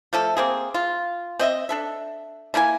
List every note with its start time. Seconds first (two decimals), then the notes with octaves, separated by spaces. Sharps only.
0.13 F3 A3 A4
0.37 A#3 C4 G#4
0.74 F4
1.39 C4 D#5 E5
1.69 D4 A4 E5
2.54 A3 A#3 E4 G#5